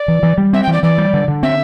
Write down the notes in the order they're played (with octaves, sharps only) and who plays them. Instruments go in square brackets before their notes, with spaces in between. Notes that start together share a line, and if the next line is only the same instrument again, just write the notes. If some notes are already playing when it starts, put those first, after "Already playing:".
Already playing: [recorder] D5
[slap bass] E3
E3
G3
[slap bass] C4 [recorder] E5
[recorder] G5
[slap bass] E3
[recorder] D5
[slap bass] E3 [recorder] D5
[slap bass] G3
D3
D3
[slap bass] C4 [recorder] E5